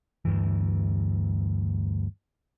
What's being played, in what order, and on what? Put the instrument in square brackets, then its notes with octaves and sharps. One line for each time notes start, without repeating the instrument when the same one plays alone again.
[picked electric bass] D2 G2 E3